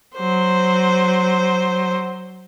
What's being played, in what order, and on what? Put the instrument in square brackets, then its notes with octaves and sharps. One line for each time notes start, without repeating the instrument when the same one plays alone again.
[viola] F#3 C5